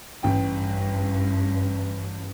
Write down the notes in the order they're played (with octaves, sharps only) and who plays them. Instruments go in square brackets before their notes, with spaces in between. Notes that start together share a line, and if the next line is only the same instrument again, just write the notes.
[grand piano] A1 G5 [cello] G2